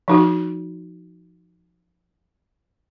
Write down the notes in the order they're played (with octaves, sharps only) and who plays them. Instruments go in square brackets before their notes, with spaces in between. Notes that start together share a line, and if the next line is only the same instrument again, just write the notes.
[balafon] F3 D#4 F#4